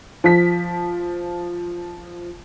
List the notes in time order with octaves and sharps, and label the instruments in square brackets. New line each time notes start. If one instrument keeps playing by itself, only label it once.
[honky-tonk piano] F3 B6